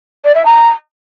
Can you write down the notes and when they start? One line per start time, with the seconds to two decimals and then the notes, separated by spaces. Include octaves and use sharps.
0.25 D5
0.35 E5
0.46 A#5